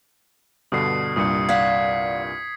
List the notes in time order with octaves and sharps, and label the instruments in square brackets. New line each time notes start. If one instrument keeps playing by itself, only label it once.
[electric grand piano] G2 B2 D3 [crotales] D#6 C7
[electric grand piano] C2 G2 A#2 [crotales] D#6 C#7
[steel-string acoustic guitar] D5 F5 F#5 [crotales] G#6 B6